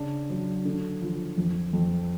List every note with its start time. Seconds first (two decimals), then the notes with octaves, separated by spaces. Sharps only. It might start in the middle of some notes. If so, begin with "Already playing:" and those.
Already playing: C#3 D4
0.30 F#3
0.65 D3
1.02 F3
1.37 F2
1.73 F2